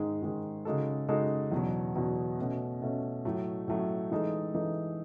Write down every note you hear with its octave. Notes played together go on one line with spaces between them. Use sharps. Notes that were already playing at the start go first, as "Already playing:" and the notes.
Already playing: G#2 D#3 G#3
G#2 D#3 G#3
C#3 G#3 D#4 F#4 A4
C#3 G#3 D#4 F#4 A4
E2 B2 F#3
E2 B2 F#3
B2 A3 C#4
B2 A3 C#4
A2 F#3 A3
A2 F#3 A3
E3 G#3 D#4 A4
E3 G#3 D#4 A4